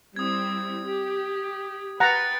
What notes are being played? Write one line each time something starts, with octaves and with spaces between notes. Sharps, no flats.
G3 C4 E4 D#6 G#6
G4
B4 F#5 G5 A#5 F#6 A6 C#7